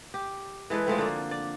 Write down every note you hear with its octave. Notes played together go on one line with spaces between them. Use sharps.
G4
E3 G#3 A4 B4
F3 G#3 A3 C4
D3 A#3 D5
D5